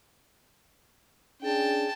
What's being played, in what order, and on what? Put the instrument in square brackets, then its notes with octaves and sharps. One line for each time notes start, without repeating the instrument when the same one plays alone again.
[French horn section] C#4 D4 G#4 [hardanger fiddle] G5 A5